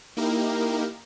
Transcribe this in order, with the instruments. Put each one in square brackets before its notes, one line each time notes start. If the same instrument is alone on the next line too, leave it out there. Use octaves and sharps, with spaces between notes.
[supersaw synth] A#3 D#4 E4 G4 A#4